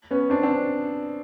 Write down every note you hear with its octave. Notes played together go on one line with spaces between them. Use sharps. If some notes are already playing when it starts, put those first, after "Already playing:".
B3 C#4
C4 D4
C4 D4